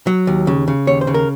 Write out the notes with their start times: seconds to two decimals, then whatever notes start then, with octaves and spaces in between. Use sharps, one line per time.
0.07 F#3
0.27 D#2
0.47 C#3
0.68 C#3
0.87 D#2 C#5
1.01 C5
1.07 C#3
1.14 A#4